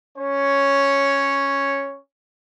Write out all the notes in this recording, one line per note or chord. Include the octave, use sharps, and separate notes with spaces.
C#4 C#5